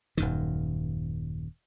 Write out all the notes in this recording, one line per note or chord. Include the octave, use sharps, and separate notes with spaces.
D#1 F#2 D#3